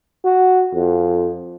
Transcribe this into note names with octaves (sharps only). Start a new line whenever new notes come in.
F#4
F2